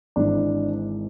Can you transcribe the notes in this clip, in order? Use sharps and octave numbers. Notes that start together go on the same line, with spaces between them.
G#1 G#2 E3 D4